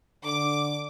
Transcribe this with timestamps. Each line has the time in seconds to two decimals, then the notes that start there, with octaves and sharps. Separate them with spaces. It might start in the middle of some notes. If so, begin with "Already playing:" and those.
0.25 D3 D6